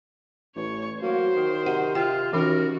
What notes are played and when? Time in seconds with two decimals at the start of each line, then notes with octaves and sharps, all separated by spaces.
0.56 A1 C#5
1.02 F#3 A#3 C5
1.36 D#3
1.66 C3 F#5
1.95 F4 G5
2.33 D#3 E3 C#4 F#4 A#4